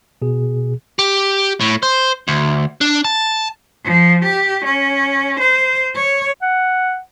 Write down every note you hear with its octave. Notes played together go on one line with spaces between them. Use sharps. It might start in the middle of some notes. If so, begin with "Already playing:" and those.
B2 G#4
G4
A2
C5
D2
D4
A5
F3
G4
C#4
C5
C#5
F#5